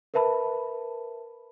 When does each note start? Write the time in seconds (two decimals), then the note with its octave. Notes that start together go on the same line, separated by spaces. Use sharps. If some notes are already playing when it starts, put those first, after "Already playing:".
0.14 A#4 B4 E5 A5 B5